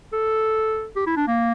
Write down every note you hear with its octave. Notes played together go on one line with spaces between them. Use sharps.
A4
G4
E4
D4
A#3